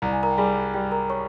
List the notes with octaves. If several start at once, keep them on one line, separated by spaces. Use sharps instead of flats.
C2 A#5
G#5
A#4 A#5
G5
G3 G#4 G#5
G3 G4 G5
A#4 A#5
C#5 C#6